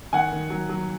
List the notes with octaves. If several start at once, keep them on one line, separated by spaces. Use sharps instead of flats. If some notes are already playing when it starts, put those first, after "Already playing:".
D#3 F#5 G#5
D#3
F#3
F#3